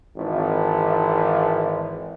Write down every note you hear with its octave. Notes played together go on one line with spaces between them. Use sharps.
G#1 E3